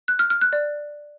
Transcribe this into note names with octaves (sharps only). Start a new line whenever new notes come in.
F#6
F6
F6
F#6
D5